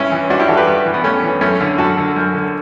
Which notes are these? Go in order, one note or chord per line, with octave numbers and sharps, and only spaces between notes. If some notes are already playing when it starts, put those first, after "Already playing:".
Already playing: G2 C#4 E4
E3
G2 D4 F#4
E4 G4
E3 F#4 A4
G4 B4
G2
E3
B3
G2 A3 C#4
E3
F#2 A3 C#4
D3
F#2 F#4 A4
D3
F#2
D3